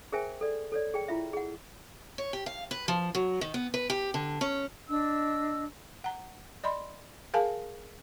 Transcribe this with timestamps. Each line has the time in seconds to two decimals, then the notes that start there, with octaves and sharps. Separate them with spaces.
0.12 G#4 A#4 C5 E5 G5 G#5
0.41 A4 D5
0.72 A4 C#5 D5
0.94 G#4 G5
1.08 E4 F4 E5
1.33 G#4 F#5
2.18 C#5
2.33 G4
2.46 F5
2.71 B4
2.88 F3
3.15 F#3
3.41 D#3
3.54 B3
3.74 B4
3.90 G4
4.14 D3
4.41 C#4
4.89 D4 D#5 E6
6.04 F#5 A#5
6.64 D5 D#5 B5 C6
7.34 G#4 A#4 F5 G#5 A5